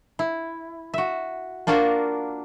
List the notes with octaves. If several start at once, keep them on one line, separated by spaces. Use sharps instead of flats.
E4
F#4 E5
A#3 D4 F4 F#4 A#4